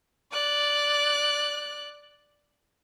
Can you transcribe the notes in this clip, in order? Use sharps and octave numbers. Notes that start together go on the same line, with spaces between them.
D5 F#6